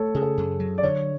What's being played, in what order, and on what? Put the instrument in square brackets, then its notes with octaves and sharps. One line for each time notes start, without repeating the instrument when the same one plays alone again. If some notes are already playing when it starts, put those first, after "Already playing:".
Already playing: [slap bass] A3 [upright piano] A4 C#5
[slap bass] C#3 [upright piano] G#4
[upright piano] A4
[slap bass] F#2
F#3
[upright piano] D5
[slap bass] D3 [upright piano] C#5